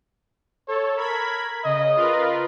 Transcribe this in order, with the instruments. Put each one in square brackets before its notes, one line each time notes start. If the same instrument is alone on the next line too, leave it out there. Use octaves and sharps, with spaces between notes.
[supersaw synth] A4 [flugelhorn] C#5
[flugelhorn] A#4 [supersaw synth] B5 G#6 B6
[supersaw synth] C#3 [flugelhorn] D#5
[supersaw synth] F4 A#4 B4